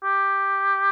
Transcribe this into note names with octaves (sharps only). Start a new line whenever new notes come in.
G4